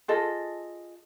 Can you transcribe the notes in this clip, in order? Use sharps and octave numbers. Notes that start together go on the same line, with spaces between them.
F4 G#4 A4 D#5